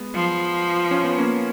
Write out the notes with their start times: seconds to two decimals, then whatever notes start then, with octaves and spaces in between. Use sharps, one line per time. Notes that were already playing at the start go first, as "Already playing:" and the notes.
Already playing: G#3 B3
0.14 F3
0.91 C#4
1.04 B3
1.18 A#3 C#4